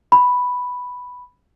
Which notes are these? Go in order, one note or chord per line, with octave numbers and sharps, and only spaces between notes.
B5